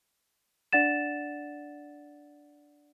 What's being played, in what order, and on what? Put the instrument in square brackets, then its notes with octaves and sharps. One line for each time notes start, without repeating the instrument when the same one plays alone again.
[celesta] D4 D5 F#5 A6 E7